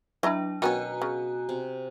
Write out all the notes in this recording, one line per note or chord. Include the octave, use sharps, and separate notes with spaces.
F#3 D4 E4 D#5 A#5
B2 D#3 B3 C#4 G#5 A#5 F#6
C#3
C3